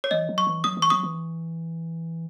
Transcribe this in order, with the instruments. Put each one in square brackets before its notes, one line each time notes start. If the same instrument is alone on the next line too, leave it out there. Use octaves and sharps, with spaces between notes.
[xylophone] C#5
[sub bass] E3 [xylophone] D#5
[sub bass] F#3
[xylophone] C#6
[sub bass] E3
[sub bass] F#3 [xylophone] D#6
[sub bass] E3
[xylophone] C#6
[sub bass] F#3 [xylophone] D#6
[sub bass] E3